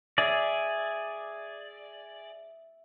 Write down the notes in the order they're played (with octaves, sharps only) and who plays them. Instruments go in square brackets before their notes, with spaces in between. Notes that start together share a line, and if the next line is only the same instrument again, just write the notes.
[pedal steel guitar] G#4 D5 [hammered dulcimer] E5